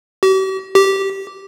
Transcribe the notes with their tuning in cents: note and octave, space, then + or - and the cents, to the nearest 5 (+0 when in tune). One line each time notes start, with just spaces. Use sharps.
G4 -45
G4 -10